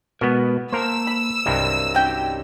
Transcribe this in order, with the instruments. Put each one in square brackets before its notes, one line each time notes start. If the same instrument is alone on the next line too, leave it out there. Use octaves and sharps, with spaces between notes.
[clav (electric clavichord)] B2 B3 [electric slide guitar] G#3 A#4
[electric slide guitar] A#3 A5 [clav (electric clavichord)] A#4 C5 [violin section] E6
[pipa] B5
[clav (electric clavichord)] C2 G2 G3 [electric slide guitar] F#3 A#4 D#5
[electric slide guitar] C#4 D#4 G4 [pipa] F#4 G5